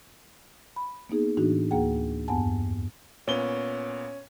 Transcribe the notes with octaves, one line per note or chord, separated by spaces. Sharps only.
B5
A#3 B3 D#4 G#4
A2 E3 D4 D#4 F#4
D2 A#3 G#4 F#5 G5
E2 G2 B3 F#5 G#5 A5
A#2 B3 C#4 G7